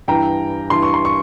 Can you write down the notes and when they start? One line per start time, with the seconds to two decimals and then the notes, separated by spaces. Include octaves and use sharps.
0.08 G2 E3 G5 A#5
0.70 G2 E3 C6
0.83 C#6
0.94 C6
1.05 C#6